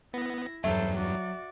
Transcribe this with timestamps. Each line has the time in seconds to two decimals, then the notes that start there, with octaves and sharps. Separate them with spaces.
0.14 B3 E4 A#6
0.64 E2 G2 F#3 A4 C5 E5
0.97 F#4 D5